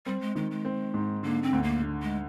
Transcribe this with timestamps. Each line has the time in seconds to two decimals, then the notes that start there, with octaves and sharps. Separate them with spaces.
0.06 G3 C4
0.21 G#3
0.35 D#3 G#3
0.51 G#3
0.65 C4
0.94 G#2
1.23 D3 A#3
1.43 C4
1.53 D2
1.63 A#3
1.82 D3
2.02 G#3